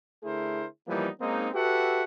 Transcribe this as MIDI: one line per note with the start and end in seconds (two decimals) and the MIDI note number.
0.23 0.65 50
0.23 0.65 57
0.23 0.65 64
0.23 0.65 68
0.23 0.65 70
0.23 0.65 72
0.88 1.08 52
0.88 1.08 53
0.88 1.08 55
0.88 1.08 58
0.88 1.08 59
0.88 1.08 63
1.20 1.48 56
1.20 1.48 58
1.20 1.48 60
1.20 1.48 61
1.20 1.48 63
1.53 2.03 66
1.53 2.03 67
1.53 2.03 69
1.53 2.03 71
1.53 2.03 76
1.53 2.03 78